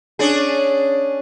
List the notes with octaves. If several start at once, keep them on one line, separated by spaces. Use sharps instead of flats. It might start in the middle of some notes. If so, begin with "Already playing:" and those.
C#4 D4 G#4